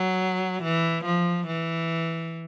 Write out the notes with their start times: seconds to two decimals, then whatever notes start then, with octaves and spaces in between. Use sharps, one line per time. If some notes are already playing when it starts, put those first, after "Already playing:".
Already playing: F#3
0.63 E3
1.05 F3
1.47 E3